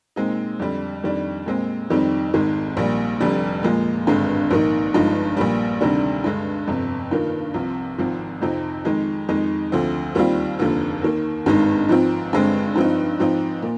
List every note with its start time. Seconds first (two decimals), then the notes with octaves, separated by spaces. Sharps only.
0.16 A#2 G#3 C4 D#4
0.59 F2 D3 G3
1.03 F2 D#3 G3 D4
1.46 A#2 G#3 C4
1.90 F2 D#3 G3 C4 D#4
2.33 G#1 G#2 D#3 G#3
2.77 A#1 A#2 G3
3.20 F1 F2 D3 G3
3.63 A#2 F3 G#3
4.07 G#1 G2 D3 G#3
4.51 A#1 G#2 D#3 A#3 D#4
4.94 G1 G2 F3 G#3 D#4
5.37 A#1 A#2 G3
5.81 D2 C3 D#3 G3 D4
6.24 G2 D3 G#3
6.68 G1 F2 C3
7.11 G2 D#3 A#3 F4
7.54 C2 C3 F3
7.98 G#1 G#2 F3 C4
8.41 F2 C3 F3 C4 D#4
8.85 F2 D#3 G#3 D#4
9.28 F2 D#3 G#3 D#4
9.72 D2 D3 F3 C4
10.15 D#2 D#3 G3 C4 F4
10.59 F1 D#2 D3 F3
11.02 D#2 D#3 A#3
11.46 G#1 G2 D#3 G#3 D#4
11.89 G#2 F3 C4 F4
12.33 G2 D3 G#3 C4
12.76 G2 F3 C4 D#4
13.20 G#2 F3 C4 D#4
13.62 A#2